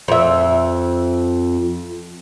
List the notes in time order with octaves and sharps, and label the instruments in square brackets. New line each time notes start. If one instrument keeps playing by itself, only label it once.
[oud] F2 E5